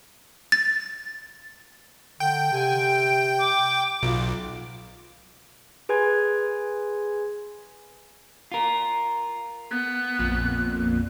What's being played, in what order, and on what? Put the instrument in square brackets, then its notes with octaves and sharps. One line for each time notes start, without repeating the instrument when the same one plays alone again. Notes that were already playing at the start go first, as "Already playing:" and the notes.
[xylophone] A6
[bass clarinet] D3 [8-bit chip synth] G5
[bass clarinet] C3 [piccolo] G#5
[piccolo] D7
D6
[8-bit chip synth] B1 [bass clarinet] F4
[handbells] G#4 B4 G#5 C6 G#6
[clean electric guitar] F4 A#4
[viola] B3 [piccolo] F#6
[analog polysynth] A#1 F2 A#2